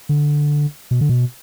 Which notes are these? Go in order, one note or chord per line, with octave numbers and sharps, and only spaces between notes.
D3
B2
D3
B2